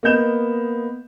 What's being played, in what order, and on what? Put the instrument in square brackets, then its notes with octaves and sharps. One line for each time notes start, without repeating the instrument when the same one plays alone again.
[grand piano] A#3 B3 D#5 G6 E7